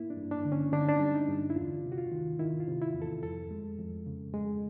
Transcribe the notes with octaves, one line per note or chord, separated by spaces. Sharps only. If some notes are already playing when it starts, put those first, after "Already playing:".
Already playing: A#3 E4
D4
G2
D4
D3
C#4
D3 D4
D#4
D4
G3
D#4
G2
E4
E2 F4
C3
F#4
F4
D#3
D#3 E4
F4
C3
E4
E2
A4
F2 A4
G#3
F2
C#3
G#3